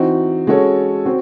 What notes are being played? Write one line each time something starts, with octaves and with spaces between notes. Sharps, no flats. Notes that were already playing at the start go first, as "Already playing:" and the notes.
Already playing: E3 C4 D#4 F#4
G#3 C#4 F#4 A4 C#5
C4 F#4